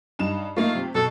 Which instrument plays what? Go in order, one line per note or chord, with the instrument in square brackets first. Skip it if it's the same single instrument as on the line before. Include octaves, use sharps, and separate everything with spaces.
[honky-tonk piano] G2 D#4 E7
[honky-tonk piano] A3 A#3 D#4 [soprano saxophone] F4
[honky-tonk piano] C3
[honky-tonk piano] B2 [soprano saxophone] A4